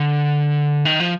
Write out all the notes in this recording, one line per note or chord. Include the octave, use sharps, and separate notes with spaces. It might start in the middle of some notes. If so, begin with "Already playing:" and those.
Already playing: D3
D#3
F3